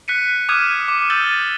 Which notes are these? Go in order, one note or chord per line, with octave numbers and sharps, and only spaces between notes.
F#6 B6 C#7 D#7
D6 D#6 F6 F#6 G#6 D#7
D6
E6 G6 A6 D#7 G7